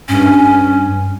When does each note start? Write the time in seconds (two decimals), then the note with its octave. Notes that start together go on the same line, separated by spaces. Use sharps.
0.09 G2 C#4